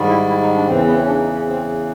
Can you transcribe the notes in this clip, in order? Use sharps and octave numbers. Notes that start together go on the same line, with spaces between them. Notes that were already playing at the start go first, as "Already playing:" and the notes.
Already playing: G#2 D#3 G3
E4
E4
D#4
D4
E2 C#3 E3 C4
B3
C4
C#4
D4
D#4
C#4
C4